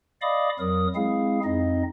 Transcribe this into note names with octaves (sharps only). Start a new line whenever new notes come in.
D5 D#5 F5 B5 D6 D#6
F2 F#3 A#4 D#6
G#3 C4 E4 G#4 F5
F2 C4 D#4 D#5